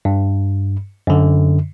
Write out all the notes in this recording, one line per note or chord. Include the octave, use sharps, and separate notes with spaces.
G2
F#2 D3